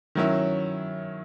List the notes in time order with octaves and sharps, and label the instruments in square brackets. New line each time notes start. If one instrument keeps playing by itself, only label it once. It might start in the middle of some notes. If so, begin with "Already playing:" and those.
[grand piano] D#3 F#3 C#4 E4